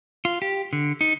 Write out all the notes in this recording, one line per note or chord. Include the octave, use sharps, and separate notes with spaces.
F4
G4
D3
D#4